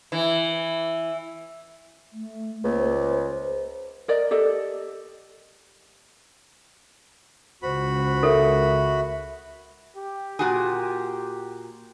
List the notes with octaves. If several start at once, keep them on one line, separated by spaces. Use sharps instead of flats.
E3
A3
C#2 A#3
C5
A#4 D5 D#5
G4 A4 D5 D#5
C#2 F#4 C5 B5
A4 A#4 E5
G4
A#2 F#4 G#4